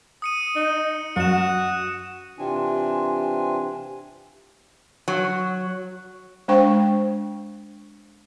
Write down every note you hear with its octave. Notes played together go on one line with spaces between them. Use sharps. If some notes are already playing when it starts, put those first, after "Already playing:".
D#6 C#7 D#7
D#4
F#2 F#4 C#7 E7
C3 E3 C4 D4 F4 G#5
F#3
G#3 D4 C5 G5 C#6